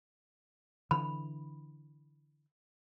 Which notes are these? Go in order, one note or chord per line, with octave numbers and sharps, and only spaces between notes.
D3 E3 B5